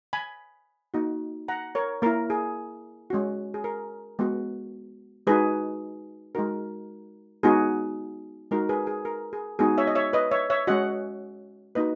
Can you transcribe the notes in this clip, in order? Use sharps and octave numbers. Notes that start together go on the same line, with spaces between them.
G#5 B5
A#3 D#4 F#4
F#5 A#5
A#4 C#5
A#3 E4 A#4
G#4
G#3 C#4 F#4
G#4
A#4
G#3 B3 F#4
G#3 D#4 F#4 G#4 B4
G#3 D#4 F#4 A#4
G#3 B3 D#4 F#4 G#4
G#3 D#4 F#4 A#4
G#4 B4
G#4
A#4
G#4
G#3 B3 D#4 F#4 G#4
C#5 E5
D#5
C#5 E5
B4 D#5
C#5 E5
C#5 E5
G#3 C#4 F#4 D#5 F#5
A#3 D#4 F#4 B4 D#5